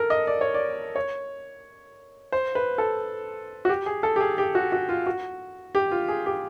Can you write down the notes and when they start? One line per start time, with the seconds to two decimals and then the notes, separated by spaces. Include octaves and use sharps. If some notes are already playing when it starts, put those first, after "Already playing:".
Already playing: A4 A#4
0.10 D#5
0.27 D5
0.41 C#5
0.54 D5
0.96 C#5
2.32 C5
2.55 B4
2.78 A4
3.65 F#4
3.69 G4
3.86 G#4
4.03 A4
4.16 G4
4.21 G#4
4.38 G4
4.55 F#4
4.72 F#4
4.89 F4
5.06 F#4
5.75 G4
5.91 F4
6.08 G#4
6.26 G4